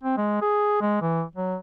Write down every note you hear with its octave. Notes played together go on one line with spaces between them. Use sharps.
C4
G#3
G#4
G#3
E3
F#3